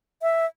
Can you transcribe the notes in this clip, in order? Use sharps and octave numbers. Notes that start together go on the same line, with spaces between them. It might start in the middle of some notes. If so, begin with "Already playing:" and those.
E5